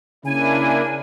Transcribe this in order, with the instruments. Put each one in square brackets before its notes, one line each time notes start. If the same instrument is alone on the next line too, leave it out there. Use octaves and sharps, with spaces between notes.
[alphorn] C#3 [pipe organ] A#3 D4 E4 [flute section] G#5